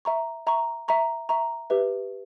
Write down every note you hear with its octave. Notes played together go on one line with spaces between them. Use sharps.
E5 A#5 C#6
E5 A#5 C#6
E5 A#5 C#6
E5 A#5 C#6
G4 B4 E5